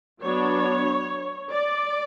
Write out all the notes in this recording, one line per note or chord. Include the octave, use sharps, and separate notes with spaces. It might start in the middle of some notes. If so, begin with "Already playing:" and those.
F#3 B3 D4 C#5
D5